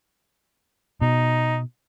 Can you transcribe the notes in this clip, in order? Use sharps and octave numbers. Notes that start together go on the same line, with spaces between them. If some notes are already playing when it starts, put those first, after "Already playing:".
B2 D#4